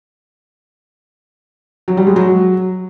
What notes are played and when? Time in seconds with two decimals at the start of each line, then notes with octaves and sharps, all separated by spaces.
1.88 F#3
1.97 G3
2.07 G#3
2.16 F#3